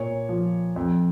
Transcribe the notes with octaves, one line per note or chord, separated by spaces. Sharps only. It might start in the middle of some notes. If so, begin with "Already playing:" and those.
Already playing: A#2 C#5
F3
F2